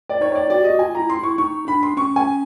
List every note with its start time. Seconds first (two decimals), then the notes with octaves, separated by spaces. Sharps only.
0.09 D5
0.21 D#4 C#5
0.32 C#5
0.35 D5
0.50 F#4 D5
0.61 G4 D#5
0.70 F#4
0.79 F4 G#5
0.95 E4 A#5
1.10 C6
1.19 E4 C#6
1.38 D#4 C#6
1.67 D4 B5
1.83 C6
1.97 C#4 C#6
2.16 G#5